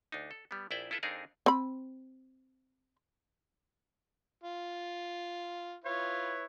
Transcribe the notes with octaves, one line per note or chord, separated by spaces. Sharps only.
D2 D4 D#4
A4
G3 B3
A#1 E4 G#4 D5 E5 G5
E4 F4 A4 B4 E5
F2 C4 D4 D#4 G#4 A#4
C4 B5
F4
E4 F4 B4 C#5